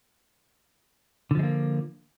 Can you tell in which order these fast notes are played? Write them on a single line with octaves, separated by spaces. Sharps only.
D3 F3 G#3 A#3